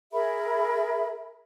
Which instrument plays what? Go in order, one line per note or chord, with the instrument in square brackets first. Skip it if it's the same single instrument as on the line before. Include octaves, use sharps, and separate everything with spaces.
[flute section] G#4 A#4 E5 B5